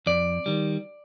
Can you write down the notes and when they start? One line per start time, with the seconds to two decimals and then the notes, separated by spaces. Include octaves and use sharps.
0.06 F2 D5
0.46 D#3 G3